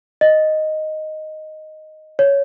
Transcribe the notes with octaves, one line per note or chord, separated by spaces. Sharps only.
D#5
C#5